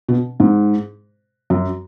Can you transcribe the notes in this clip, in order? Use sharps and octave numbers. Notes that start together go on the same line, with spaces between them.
B2
G#2
F#2